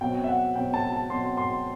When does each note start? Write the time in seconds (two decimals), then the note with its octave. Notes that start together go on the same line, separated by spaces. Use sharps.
0.01 B2 F#3 C4 G5
0.24 E5
0.29 F#5
0.55 B2 F#3 C4 G5
0.74 A5
0.92 A5
1.10 B2 F#3 C4 C6
1.37 C6